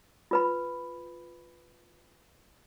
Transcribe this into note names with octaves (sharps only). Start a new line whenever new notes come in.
F4 B4 B5